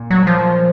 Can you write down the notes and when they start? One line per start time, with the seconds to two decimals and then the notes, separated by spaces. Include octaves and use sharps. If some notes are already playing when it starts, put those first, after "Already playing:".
Already playing: A#2
0.11 F#3
0.27 F3